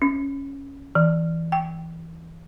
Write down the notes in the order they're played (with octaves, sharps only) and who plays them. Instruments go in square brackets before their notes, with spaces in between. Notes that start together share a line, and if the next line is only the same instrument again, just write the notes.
[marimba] C#4
E3
G5